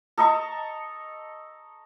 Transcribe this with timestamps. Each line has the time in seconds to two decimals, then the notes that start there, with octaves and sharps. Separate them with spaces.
0.18 A4 D#5 A#5 C#6